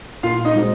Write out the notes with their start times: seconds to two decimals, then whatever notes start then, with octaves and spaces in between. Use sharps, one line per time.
0.23 A#2 F4 F5
0.45 D#4 D#5
0.56 G#3 C4 F#4 C5